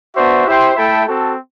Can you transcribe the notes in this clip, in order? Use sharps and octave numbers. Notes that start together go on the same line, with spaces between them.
B3 D4 F#4 C5 E5
E4 G4 C5 G5
A3 E4 A4 E5 G5
C4 F#4 A4